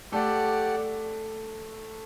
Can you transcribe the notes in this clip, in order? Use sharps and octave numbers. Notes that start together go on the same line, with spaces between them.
A3 G4 A4 D5 F#5